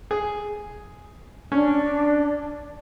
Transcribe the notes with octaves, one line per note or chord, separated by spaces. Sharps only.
G#4
C#4 D4